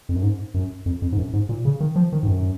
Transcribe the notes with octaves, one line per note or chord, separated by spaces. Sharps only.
F2
F#2
G#2
F#2
F2
F2
G#2
F#2
G#2
A#2
C#3
D#3
F3
D#3
G#2
F#2